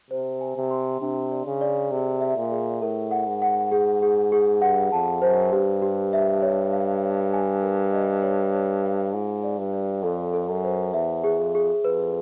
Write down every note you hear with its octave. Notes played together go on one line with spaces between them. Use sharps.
C3 C5
G#5
C3
C6
C3 D4
D5
C#3
D5
C3 G#4
E5
A#2
G#4
A2 A#4
F#5
G#2
F#5
G#4
G#4
G#4
G2 F#5
F2 A5
F#2 C5
G2 G4
G4
E5
C#5
F5
C#5
G#5
A#4
D#5
C#5
C#5
F5
G#2 F4
D5
G2
D5
F2 A4
A4
F#2
C5
E2 E5
G#4
F2
G#4
F2 B4